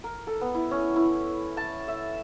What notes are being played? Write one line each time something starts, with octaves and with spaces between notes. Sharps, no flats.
A#4
A4
B3
E4
C#4
E4
A5
E5